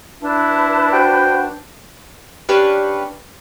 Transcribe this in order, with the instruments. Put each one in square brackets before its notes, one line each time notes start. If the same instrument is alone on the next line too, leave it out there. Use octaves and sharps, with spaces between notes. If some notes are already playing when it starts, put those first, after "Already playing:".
[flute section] D4 B4 A5 [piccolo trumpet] E4
[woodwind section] F#4 C5 G5
[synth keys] C#4 D4 G4 B4 F5 C#6